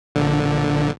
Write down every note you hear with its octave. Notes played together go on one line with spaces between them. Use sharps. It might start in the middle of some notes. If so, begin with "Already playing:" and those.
A#1 D3